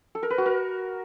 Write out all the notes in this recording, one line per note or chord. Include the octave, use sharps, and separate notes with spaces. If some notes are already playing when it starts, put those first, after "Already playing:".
A4
A#4
B4
F#4
A#4